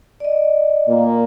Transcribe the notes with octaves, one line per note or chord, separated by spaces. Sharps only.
D5 D#5
A#2 A#3